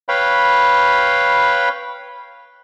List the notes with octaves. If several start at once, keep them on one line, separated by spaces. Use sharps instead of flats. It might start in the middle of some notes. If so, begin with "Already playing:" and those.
B4 C#5 F5 G5 B5